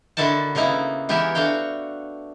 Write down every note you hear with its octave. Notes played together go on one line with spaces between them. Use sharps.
D3 D#3 E4 F#4 D5 A5
C#3 A#3 B3 D#4 E4
E3 B3 G4 G#4 A#4 E5
A3 D4 F#4 F5 G5